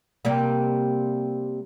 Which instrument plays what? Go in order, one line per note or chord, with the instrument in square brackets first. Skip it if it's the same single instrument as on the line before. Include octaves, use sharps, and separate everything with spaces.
[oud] C3 G3 A#3